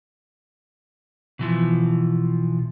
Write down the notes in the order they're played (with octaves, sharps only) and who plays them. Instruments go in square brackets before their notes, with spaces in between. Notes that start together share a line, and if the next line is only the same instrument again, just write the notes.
[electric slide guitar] B2 E3 F3